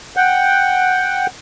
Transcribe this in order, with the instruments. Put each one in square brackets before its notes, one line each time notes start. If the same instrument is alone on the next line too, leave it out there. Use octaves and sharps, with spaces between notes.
[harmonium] F#5 G5